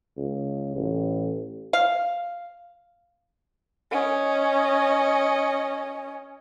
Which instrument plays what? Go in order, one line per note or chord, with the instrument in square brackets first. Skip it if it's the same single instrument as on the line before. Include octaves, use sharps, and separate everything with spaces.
[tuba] C#2
A1
[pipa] F5
[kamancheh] C#4 D#5